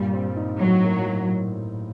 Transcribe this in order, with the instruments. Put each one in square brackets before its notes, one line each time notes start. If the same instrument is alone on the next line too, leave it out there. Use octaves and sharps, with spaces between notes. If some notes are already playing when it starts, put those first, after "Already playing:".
Already playing: [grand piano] G2 A#2 [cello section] G3
[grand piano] C4
D#4
[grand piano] A2 [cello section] F#3
[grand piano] A#3